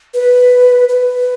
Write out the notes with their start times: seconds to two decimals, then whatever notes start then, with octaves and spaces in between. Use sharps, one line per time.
0.14 B4
0.89 B4